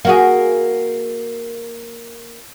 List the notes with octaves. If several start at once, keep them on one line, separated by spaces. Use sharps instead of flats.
A#3 F#4 G#4